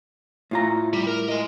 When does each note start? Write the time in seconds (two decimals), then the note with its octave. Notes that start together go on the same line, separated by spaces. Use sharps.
0.51 A2 F4 A#5
0.93 G3
1.07 A#4
1.28 G#3 D#5